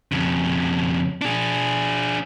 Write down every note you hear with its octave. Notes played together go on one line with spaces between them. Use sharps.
F2 C#3
D4 G#4